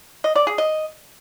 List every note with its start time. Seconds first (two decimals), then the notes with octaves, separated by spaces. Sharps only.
0.24 D#5
0.36 D5
0.47 G#4
0.58 D#5